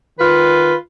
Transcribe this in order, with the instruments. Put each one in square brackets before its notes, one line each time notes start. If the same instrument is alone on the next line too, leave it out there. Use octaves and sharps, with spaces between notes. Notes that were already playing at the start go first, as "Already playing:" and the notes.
[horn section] D#3 F4 B4